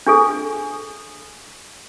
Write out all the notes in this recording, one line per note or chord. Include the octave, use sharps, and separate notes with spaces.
D4 G#4 A4